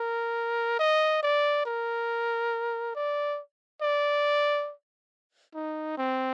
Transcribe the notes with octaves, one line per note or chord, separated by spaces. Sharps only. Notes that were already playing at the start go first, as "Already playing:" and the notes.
Already playing: A#4
D#5
D5
A#4
D5
D5
D#4
C4